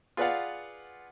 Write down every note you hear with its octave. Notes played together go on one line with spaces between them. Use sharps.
F4 G#4 B4 D5 F5 F#5